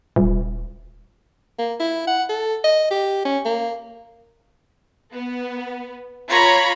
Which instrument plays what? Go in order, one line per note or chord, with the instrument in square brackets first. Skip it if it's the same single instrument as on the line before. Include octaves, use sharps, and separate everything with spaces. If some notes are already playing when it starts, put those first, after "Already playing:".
[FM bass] D#1
[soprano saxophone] A#3
E4
F#5
A4
D#5
G4
C#4
A#3
[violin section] B3
F4 C#5 A#5 B5